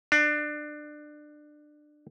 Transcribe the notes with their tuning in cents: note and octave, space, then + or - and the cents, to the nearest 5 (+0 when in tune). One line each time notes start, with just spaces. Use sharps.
D4 +25